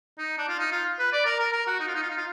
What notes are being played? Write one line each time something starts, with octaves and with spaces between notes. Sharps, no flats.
D#4
D4
F4
D#4
F4
B4
D5
A#4
A#4
A#4
F#4
D#4
F4
D#4
F4
D#4
F4